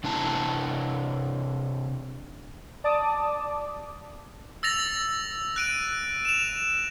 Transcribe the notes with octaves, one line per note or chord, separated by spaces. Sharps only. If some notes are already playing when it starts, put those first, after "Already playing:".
C3 D4 E4 A5 A#5
D5 A5 D6 D#6
E6 A6 A#6 F7
F#6 D7 D#7
E7 F7